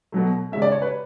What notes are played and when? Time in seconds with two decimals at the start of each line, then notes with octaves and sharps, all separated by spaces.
0.12 B2 F#3 A3
0.52 C#3 G#3 C#4 E5
0.62 D5
0.72 C#5
0.82 B4